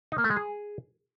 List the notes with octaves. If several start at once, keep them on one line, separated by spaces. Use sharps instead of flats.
D#4
A#3
A3
G#3
G#4